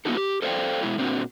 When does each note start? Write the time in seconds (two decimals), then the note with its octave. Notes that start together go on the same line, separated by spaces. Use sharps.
0.05 A#3 B3 D#4 E4 F#4 A4
0.17 G4
0.42 A4 C5 D5 E5 F5 G5
0.83 B2 G#3 E4
0.98 A#2 C4 D4 F#4